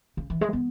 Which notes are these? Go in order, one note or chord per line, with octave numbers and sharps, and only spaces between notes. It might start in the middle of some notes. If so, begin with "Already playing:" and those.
C#3
E3
G#3
B3